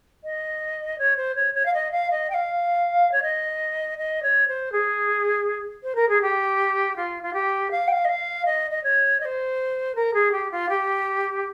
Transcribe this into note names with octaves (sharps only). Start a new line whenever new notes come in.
D#5
C#5
C5
C#5
C#5
F5
D#5
F5
D#5
G5
F5
C#5
D#5
D#5
C#5
C5
G#4
C5
A#4
G#4
G4
F4
F4
G4
F5
G5
F5
D#5
F5
D#5
D#5
C#5
D#5
C5
A#4
G#4
G4
F4
G4